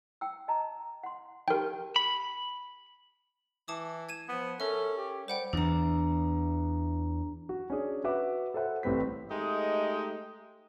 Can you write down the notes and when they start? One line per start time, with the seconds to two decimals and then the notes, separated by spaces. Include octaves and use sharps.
0.21 G5 E6
0.48 D#5 A5 A#5
1.03 F#5 C6
1.48 D#4 F#4 G4 A#4 G5
1.96 B5
3.68 E3 A5 D6 D#6
4.09 G#6 D#7 E7
4.28 F3 B3
4.60 C#4 A4 A#4 E5
4.97 G4
5.28 G3 C5 F#5 G5
5.53 E2 E3 D4 A#5
7.49 F#4
7.70 C#4 D4 G#4
8.04 F#4 B4 E5 F#5 D6
8.54 A4 C5 E5 F#5
8.83 A1 A2 G3 C4 B4 B6
9.30 G#3 A3 D#4 G4 D#5